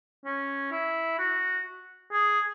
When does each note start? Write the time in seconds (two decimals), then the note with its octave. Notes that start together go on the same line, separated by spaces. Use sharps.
0.25 C#4
0.71 E4
1.18 F#4
2.12 G#4